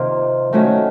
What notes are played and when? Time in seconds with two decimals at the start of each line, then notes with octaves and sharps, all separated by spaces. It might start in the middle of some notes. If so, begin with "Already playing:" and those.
Already playing: C3 D#3 A#3 F4
0.53 D#3 A3 C#4 F#4